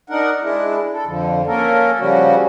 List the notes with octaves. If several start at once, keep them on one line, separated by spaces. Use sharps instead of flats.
D4 D#4 A#4 F#5
G#3 D4 E4
A4
F2 D3 F3
A#3 C#4 A4 A#4
C#3 F3 G3 C#4 F#4